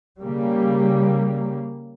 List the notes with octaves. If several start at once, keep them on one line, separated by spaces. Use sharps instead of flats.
C#3 G3 A#3